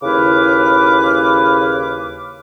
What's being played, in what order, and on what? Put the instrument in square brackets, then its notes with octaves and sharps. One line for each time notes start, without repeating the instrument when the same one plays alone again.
[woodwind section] D#2 C#3 E4 B4 F5 D6